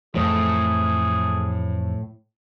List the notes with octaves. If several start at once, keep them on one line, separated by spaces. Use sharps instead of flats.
F2 A2 E3 F3 G#4